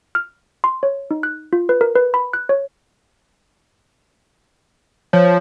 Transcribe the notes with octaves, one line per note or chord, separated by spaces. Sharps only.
F6
C6
C#5
D#4
F#6
F4
B4
A#4
B4
B5
F#6
C#5
F3 C#5